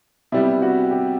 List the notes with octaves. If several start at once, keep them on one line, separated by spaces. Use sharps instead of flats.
C3 G3 B3 E4
F#4
G4